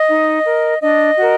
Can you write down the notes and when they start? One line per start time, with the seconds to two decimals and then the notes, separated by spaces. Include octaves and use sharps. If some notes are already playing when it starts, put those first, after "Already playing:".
Already playing: D#5
0.08 D#4
0.45 A#4
0.82 D4 D#5
1.18 F#4 A#4